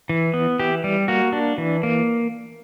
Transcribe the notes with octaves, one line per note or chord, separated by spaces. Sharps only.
E3
B3
E3 G4
G3
A#3 F#4
D4
E3
A#3